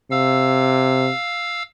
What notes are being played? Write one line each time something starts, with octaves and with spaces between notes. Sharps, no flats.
C3 F5 E6